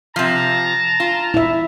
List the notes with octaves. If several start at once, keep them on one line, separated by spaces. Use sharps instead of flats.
C3 F3 A5 A#5
F4
E4 E5